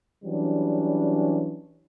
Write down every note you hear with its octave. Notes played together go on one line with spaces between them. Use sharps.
E3 F#3 G3 C#4 D4